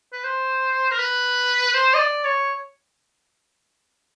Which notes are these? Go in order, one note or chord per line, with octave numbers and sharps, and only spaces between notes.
B4
C5
A#4
B4
C5
D#5
D5
C#5